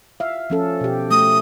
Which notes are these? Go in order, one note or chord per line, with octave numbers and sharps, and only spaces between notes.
E5 F5
F3 C#4 A4
B2 G4
A3 D#6